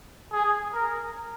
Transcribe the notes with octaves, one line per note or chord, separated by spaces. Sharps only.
G#4
A#4